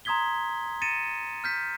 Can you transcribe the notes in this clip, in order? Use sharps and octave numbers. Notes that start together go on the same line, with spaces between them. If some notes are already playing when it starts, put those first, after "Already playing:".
A#5 C6 D#6 G#6 B6 G7
A6 A#6 C#7 D#7 E7
F6 G6 B6